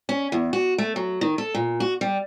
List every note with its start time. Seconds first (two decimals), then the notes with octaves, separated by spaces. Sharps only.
0.09 C#4
0.32 E2
0.53 F#4
0.78 A3
0.96 F#3
1.21 D#3
1.38 A4
1.54 A#2
1.80 F#4
2.01 G3